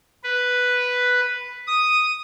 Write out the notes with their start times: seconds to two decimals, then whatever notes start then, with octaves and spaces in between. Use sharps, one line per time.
0.24 B4
1.67 D#6